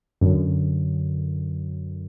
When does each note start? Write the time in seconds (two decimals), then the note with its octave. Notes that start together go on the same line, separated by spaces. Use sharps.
0.21 F#2 D3